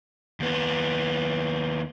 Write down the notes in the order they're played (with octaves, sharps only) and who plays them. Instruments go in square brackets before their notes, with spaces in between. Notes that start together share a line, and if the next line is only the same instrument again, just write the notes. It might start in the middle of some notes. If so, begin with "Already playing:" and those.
[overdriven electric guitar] D#2 B3